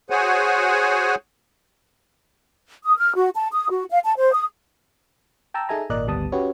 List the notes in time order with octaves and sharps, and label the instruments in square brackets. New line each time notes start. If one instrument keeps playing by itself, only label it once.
[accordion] F#4 G#4 C5 C#5 F#5 G#5
[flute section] D#6
F6
F#4
A5
D#6
F#4
F5
A5
C5
D#6
[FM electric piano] G5 A5 A#5 E6
D#4 G#4 A4 E5 G#5 A#5
G#1 A#2 A#4 D5 D#5 F#6
G#1 D2 G3 B3 A5 D#6
C#4 F#4 G4 B4 C#5